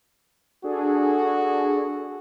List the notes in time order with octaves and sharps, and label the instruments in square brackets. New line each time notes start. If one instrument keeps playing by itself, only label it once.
[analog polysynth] D4 G#4 A4 [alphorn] F#4